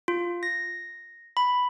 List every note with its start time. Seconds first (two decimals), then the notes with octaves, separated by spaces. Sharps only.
0.08 F4
0.43 A#6
1.37 B5